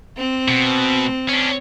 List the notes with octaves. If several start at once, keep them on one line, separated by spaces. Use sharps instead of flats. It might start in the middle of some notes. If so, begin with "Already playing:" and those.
C4
B2
C#4 D4